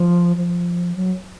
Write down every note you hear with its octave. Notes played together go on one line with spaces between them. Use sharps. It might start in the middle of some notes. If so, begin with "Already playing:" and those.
Already playing: F3
F3
F#3